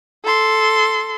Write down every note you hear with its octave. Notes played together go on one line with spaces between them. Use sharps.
A4 C6